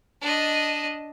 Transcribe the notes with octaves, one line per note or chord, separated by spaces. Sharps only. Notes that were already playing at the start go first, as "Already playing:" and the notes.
D4 D#5